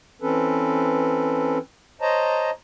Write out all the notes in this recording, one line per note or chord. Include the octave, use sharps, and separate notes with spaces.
E3 C4 C#4 A4 B4
C5 C#5 D#5 A5 A#5